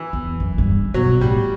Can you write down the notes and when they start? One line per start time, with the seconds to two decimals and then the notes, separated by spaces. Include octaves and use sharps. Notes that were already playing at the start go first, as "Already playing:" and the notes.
Already playing: E3
0.13 E2
0.40 F#2
0.58 G2
0.94 B2 F#3
1.21 A2 G3